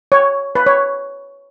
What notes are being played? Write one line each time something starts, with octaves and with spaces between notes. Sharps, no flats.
C#5
B4
C#5